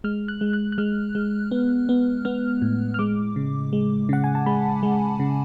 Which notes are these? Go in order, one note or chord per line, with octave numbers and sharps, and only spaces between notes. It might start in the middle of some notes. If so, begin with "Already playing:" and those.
G#3 F6
F#6
G#3
F#6
F#6
G#3 F6
G#3
B3
B3
B3 F6
A2
F6
G#3 D6
C#3
G#3
C#3 F#5
G#5
A5
G#3 B5
G#3
C#3